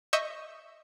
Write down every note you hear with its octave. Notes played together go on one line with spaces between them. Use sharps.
D#5 E5 C#6 E6 G6